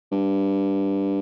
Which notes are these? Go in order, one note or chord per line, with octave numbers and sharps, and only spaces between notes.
G2